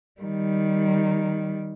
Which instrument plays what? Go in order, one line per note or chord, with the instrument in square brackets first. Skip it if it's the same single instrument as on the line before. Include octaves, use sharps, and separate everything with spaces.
[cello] D#3 G3